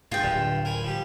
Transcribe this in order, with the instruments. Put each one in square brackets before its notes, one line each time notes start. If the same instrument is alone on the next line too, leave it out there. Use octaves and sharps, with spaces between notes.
[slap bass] G2 [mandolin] F4 G5 [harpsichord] G#4
[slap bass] D1 [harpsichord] G2 D3
[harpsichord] A#4 G#5 B5
F3 G3 G4